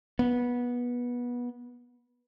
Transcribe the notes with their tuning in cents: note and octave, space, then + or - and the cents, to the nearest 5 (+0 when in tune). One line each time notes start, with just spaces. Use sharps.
B3 -20